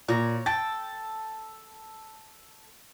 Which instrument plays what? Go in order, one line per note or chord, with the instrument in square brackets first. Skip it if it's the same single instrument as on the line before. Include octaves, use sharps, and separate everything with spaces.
[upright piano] A#2 [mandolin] C#5 A#5
[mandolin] A4 G5 [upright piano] A6